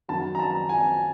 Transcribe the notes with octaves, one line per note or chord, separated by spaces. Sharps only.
F#2 D#3 F#3 A5
A#5
A5
G#5